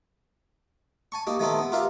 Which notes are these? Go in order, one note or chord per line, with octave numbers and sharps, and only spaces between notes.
G#5 A5 C#6
A#3 D#4 G4
D#3 A3 B3 C4 D#4 A4
B3
F4 G4 A#4 E5 F5